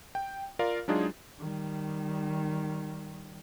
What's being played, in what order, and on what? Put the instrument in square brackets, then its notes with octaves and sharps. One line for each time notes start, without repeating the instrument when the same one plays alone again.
[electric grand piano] G5
F4 A#4 D5 F5
F#3 G#3 D4 D#4 F4 G#4
[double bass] D#3 G3